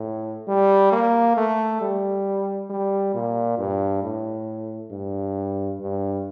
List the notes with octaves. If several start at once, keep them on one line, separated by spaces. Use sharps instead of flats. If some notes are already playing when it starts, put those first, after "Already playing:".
Already playing: A2
G3
A#3
A3
G3
G3
A#2
G2
A2
G2
G2